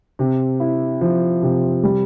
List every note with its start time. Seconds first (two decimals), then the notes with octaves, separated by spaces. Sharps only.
0.19 C3
0.60 E4
1.01 F3
1.43 C3
1.83 G3